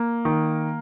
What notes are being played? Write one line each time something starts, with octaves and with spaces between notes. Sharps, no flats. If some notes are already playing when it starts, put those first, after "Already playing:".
Already playing: A#3
D#3